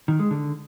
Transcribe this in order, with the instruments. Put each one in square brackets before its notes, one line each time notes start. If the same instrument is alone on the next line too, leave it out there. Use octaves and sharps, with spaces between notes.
[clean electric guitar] D#3
G#3
D3